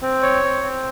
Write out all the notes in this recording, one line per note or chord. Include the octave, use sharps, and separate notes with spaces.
C4
C#5
C4
C4